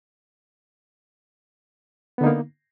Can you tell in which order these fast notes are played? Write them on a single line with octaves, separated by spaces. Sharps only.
B3 D3 D#4 A#3